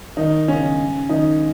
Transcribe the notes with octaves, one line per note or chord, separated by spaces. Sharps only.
D#3 D#4
C#3 C#4
D#3 D#4